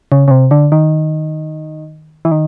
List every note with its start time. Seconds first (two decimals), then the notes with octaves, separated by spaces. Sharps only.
0.12 C#3
0.28 C#3
0.31 C3
0.51 D3
0.72 D#3
2.25 E3
2.31 D#3